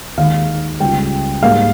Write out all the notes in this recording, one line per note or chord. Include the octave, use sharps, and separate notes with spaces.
D#2 D#3 G#3 D#4 F5
C#2 C#3 G3 G5
G#2 G3 A#3 F5